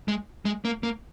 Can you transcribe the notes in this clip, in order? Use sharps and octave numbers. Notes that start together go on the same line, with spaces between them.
G#3
G#3
A#3
A#3